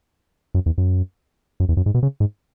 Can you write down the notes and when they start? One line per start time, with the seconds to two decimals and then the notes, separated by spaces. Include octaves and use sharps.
0.54 F#2
0.66 E2
0.78 F#2
1.60 F#2
1.69 E2
1.77 F#2
1.86 G#2
1.94 B2
2.03 C#3
2.20 G#2